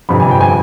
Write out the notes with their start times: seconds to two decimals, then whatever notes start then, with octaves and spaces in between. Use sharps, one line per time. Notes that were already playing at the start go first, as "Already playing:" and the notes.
0.09 G1 F2 C3 B5
0.20 G#5
0.31 G5
0.41 G#5